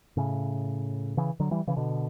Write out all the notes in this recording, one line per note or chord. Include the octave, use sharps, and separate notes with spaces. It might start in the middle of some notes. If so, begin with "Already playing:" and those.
A2 C#3
C#3 E3
D3 F#3
E3 G3
C#3 E3
B2 D3